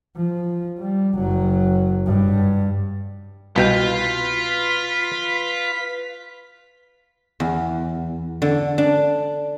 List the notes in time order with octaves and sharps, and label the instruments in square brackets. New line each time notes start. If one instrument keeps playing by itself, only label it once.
[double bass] F3
G3
F#1 F#3
G2
[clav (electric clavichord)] C2 B2 G5 [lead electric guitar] F4 F5 [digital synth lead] B4 [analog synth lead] B6
[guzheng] E2
D3
D4